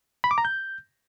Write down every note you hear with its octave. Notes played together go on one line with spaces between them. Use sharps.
B5
D6
A#5
G6